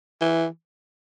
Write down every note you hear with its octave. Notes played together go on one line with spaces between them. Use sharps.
E3